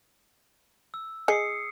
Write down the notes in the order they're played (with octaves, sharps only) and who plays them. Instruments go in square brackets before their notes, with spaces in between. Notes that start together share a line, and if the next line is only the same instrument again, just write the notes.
[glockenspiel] E6
[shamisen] G#4 D#5 [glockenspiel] D#6 C7 C#7